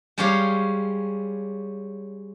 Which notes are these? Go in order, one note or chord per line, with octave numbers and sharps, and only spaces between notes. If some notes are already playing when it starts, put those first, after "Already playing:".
G3 G#3 C#4 G4 C#5 F5